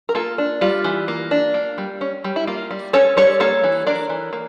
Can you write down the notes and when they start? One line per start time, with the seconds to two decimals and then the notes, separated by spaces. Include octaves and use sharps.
0.09 A#4
0.15 A#3 F4 A4
0.38 D4
0.61 G3 F4
0.84 E3
1.08 A#3
1.31 D4
1.54 A#3
1.78 G3
2.01 C#4
2.24 G3
2.36 E4
2.47 A#3 F4
2.71 G3
2.93 C#4 A4 C#5
3.17 G3 A4 C#5
3.40 A#3 A4 C#5
3.64 E3
3.87 D4 A#4 D5
4.10 E3
4.33 A#3